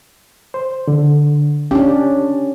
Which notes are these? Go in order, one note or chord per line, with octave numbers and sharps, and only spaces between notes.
C5
D3
C#4 D4 G4